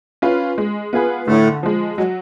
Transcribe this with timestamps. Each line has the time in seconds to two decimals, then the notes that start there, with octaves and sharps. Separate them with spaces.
0.22 C#4 F4 B4
0.58 G#3
0.93 B3 F4 G#4 B4
1.27 A2 D3 A3
1.63 F3 G#3
1.98 F#3 G#3